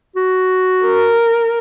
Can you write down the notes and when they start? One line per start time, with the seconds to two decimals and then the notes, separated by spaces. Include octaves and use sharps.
0.16 F#4
0.83 A#4